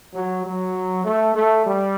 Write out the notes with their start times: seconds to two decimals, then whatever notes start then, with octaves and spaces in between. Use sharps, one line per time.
0.14 F#3
0.46 F#3
1.05 A3
1.36 A3
1.67 G3